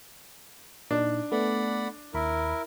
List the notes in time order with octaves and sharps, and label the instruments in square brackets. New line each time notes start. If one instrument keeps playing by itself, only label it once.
[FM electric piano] A#2 D#4 [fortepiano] D4
[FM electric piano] A3 B3 A4 [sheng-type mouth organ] D5 F#5 B5
[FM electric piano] D#2 B5 [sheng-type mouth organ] E4 A#4